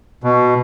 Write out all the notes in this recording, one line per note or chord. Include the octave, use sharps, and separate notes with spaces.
B2